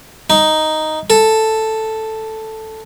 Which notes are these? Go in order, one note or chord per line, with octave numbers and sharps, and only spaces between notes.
D#4
A4